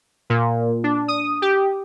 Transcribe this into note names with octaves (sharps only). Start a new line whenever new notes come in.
A#2
D4
D#6
G4